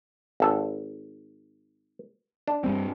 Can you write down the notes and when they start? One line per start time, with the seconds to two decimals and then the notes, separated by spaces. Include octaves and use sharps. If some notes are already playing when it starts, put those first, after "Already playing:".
0.40 G#1 A4
2.48 D4
2.64 G2 G3 C4